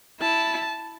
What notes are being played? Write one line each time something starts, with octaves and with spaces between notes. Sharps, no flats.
E4 A5